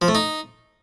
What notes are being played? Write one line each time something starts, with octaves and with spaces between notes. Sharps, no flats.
F3
A3
D#4